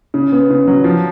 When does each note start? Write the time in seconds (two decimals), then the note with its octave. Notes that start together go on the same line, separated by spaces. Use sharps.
0.14 C#3
0.32 B3
0.50 C#3
0.67 F#3
0.84 F3